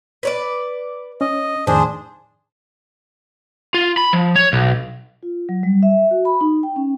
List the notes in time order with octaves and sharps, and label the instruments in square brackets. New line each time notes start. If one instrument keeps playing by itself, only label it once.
[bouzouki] B4 C#5 D5
[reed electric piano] C#4 [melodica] D#5
[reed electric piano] F2 A2 D#3 [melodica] D4 G#4 [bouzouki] C5
[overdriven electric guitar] F4
B5
F3
C#5
B1
[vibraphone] F4
F#3
G3
E5
F#4
B5
D#4
G5
C#4